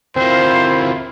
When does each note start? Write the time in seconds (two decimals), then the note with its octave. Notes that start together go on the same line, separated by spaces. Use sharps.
0.16 D2 A#3 C4 E4 F4 C5